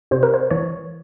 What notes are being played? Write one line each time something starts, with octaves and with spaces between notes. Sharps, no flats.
C3 C5
A#4
C5
E3 C#5